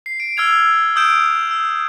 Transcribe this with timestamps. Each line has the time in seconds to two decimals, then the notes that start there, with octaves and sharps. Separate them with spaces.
0.06 C7
0.20 D7
0.37 E6 F6 G#6 F7
0.96 D#6 E6 G6 D7 E7
1.51 E6